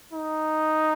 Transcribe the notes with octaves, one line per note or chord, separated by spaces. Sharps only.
D#4